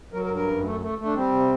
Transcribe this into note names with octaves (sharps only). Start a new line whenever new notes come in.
F#3 A#4
A#4
G2
A#4
F#2
A3
A3
A3
D4
G3 C4
C3